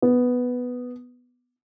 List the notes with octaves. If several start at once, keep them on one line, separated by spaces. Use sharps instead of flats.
B3